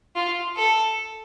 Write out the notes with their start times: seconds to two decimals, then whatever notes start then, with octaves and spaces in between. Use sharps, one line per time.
0.15 F4
0.56 A4